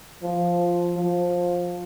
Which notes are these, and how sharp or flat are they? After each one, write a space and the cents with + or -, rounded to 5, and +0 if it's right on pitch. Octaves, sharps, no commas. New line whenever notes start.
F3 +0
F3 +15